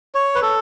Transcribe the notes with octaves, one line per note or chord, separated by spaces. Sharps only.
C#5
B4
A4